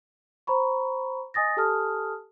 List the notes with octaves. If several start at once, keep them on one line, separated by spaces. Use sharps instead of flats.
C5 A#5 B5 C#6
D#5 G#5 D#6 A6 A#6
G4 A4 G#5 A5 D#6 F6